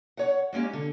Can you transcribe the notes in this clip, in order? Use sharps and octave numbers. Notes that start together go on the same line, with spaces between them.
C#5 F#5
G#3 A#3 C#4 G4
D3